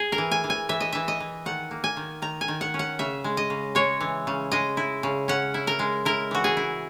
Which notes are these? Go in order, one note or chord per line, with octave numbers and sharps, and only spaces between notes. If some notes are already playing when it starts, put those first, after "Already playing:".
Already playing: G#4
A#4
E3
G#5
E3
G#5
E3 E5
D#5
E3 E5
D#5
E3
D#3 F#5
A#3
G#5
D#3
D#3 A#5
G#5
D#3
F#5
C#4
F#5
C#3 E5
G#3
D#5
C#3
G#3 C#5
E3
C#3
G#3 D#5
E4
C#3
C#4 F#5
E4
A#4
G#3
E4 A#4
E3 F#4
G#4
E4